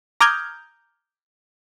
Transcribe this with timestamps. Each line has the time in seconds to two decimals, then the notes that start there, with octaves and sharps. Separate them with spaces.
0.21 A#5 D6 D#6 F6 G6 G#6